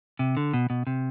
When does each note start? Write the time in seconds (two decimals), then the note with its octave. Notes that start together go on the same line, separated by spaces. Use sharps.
0.19 C3
0.37 D3
0.54 B2
0.70 B2
0.87 C3